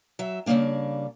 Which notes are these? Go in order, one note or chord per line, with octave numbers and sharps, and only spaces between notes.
F#3 E5
C#3 F#3 G3 A#3 D4